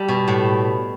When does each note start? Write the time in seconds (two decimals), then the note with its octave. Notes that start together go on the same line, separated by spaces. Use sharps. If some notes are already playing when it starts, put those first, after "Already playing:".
Already playing: G3 A4
0.08 B2
0.28 A2